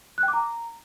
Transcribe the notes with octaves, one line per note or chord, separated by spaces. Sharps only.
F#6
G5
D6
A#5